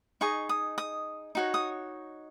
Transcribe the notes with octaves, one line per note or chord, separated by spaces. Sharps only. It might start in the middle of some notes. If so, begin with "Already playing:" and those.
D#4 G#4 D#5 C#6
D#6
D#6
D#4 F#4 C#5
D#6